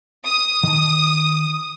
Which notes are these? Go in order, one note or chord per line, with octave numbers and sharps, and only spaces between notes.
D#6
D#3 A5